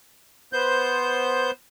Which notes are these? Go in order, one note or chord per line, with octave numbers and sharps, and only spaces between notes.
B3 C5 G6